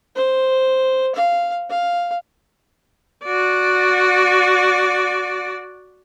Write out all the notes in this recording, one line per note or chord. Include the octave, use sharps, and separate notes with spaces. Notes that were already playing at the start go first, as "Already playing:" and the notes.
C5
F5
F5
F#4 D5